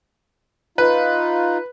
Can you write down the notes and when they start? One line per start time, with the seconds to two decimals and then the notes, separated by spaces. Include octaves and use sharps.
0.78 D#4 F4 B4